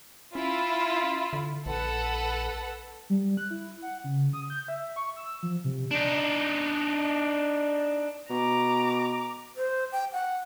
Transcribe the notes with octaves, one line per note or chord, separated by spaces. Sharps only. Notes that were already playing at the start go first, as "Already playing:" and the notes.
C#4 E4 F4
D3
A#1 A4 B4 F#5
G3
F#6
E4
F#5
C#3
D#6
G6
E5
C#6
E6
F3
C3
D4 D#4
B2 A#5 D6
C5
G5
F#5